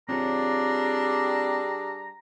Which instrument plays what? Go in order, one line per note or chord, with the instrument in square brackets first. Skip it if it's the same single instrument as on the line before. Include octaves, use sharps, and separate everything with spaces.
[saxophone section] G3 D4 G#4 [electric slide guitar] C4 F4 C#5 [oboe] A#5